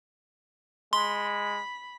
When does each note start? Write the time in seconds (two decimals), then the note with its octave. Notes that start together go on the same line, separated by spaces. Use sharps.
0.93 G#3 B5 C6